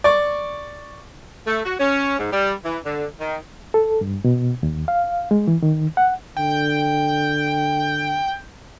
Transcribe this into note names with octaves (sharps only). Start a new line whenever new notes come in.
D5 C#6
A3
F#4
C#4
G#2
G3
E3
D3
D#3
A4
G2
B2
D#2
F5
G#3
E3
D#3
F#5
D3 G5